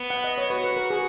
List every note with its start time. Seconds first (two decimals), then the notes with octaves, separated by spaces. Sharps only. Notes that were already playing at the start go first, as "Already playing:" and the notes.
Already playing: B3
0.10 F#5
0.24 D#5
0.38 C#5
0.50 F#4 B4
0.64 B4
0.76 A#4
0.90 G#4